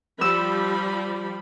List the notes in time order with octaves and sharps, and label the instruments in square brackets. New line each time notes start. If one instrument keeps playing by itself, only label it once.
[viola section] F3 G3 B5 [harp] E6